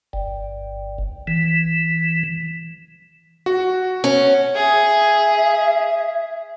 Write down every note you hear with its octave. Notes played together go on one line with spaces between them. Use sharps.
G1
E3
F#4
C#4
G#4 E5